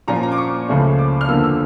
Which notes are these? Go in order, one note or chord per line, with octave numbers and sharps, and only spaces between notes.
A#2 F3 C#4 F4 A#5
A#5
D6
C#6
C#2 C#3 F3 A3 C#4
D6
F6
E2 D3 F3 A#3 E6
E6